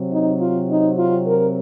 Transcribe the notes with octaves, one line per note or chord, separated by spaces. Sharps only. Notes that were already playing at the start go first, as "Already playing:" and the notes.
Already playing: C3 F#3 C4
D#4
F4
D#4
F4
A#4